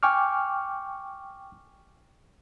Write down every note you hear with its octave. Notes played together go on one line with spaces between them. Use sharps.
G5 G#5 C#6 D6 F6